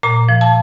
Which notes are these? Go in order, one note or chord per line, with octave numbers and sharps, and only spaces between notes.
A#2 A#5
F3
A5